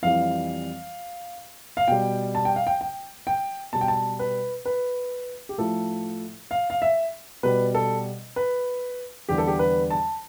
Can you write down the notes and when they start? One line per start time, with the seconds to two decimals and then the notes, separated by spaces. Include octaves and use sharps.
0.02 F2 E3 G3 F5
1.77 F5
1.88 B2 G3 G5
2.35 A5
2.45 G5
2.56 F5
2.67 G5
2.81 G5
3.27 G5
3.73 B2 G3 A5
3.81 G5
3.88 A5
4.19 B4
4.66 B4
5.49 G4
5.58 A2 F3 A3 A4
6.51 F5
6.70 F5
6.82 E5
7.43 B2 G3 B4
7.75 A4
8.36 B4
9.29 E2 D3 G3 G4
9.38 A4
9.47 G4
9.59 B4
9.90 A5